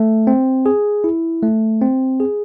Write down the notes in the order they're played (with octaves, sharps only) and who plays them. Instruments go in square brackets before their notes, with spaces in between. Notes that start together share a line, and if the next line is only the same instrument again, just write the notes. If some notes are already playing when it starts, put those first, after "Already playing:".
Already playing: [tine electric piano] A3
C4
G#4
E4
A3
C4
G#4